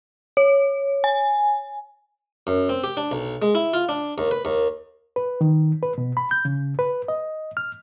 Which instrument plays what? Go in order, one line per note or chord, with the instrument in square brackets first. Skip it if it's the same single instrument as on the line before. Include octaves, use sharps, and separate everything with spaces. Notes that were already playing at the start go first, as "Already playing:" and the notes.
[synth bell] C#5
G#5
[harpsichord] F#2
C4
G4
D4
B1
G#3
E4
F4
D4
D#2
B4
D#2
[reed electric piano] B4
D#3
B4
B2
B5
G6
C#3
B4
D#5
F6